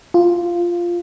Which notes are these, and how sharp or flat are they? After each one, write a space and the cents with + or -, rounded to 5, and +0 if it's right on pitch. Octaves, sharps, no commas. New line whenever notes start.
F4 -5